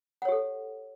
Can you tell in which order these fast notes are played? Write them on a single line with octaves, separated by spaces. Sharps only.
F#5 C#5 G4 A4